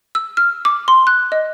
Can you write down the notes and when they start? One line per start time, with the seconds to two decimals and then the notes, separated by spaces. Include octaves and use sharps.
0.15 E6
0.37 F6
0.65 D6
0.88 C6
1.07 F#6
1.32 D#5